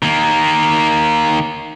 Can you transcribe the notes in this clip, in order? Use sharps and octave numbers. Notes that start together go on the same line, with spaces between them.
D#3 A#3